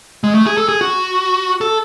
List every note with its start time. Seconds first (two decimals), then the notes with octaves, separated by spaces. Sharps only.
0.24 G#3
0.35 A3
0.46 G#4
0.57 A4
0.69 G#4
0.81 F#4
1.61 A4